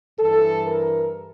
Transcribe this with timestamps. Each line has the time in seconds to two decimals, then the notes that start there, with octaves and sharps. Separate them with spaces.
0.19 G2 E3 A4
0.65 A#4